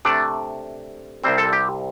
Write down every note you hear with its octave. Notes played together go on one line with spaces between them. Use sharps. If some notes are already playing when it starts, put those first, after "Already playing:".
C3 A3 D4 D5
C2 C3 G3 C4 C5
A4
G4